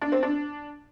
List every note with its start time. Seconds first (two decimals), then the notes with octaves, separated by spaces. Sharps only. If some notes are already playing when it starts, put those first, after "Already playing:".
0.02 D4
0.12 C4
0.23 D4